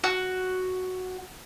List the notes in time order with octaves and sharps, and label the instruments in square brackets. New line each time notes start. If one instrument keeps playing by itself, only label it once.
[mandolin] F#4